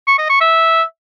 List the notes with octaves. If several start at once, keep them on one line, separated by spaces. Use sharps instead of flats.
C#6
D#5
C#6
E5